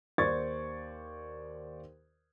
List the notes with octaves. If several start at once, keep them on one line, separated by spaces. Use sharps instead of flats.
D#2 C5 D5 C#6 G#6 A6